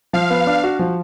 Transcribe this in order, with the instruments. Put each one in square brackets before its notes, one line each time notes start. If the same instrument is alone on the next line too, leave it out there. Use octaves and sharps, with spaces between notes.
[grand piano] F3 [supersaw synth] F5
[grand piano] B3
D4
F#4
F3